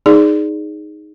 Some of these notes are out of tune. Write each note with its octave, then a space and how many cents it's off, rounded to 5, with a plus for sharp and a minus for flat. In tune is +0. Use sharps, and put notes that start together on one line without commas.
D#4 +0 G#4 +0 D5 +0